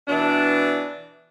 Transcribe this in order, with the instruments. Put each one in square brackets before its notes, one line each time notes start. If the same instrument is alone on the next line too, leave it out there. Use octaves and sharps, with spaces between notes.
[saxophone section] B2 E3 D4